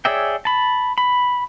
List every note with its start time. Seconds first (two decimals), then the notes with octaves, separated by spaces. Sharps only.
0.05 G#4 C#5 D5 E5 G5
0.45 A5 B5
0.98 B5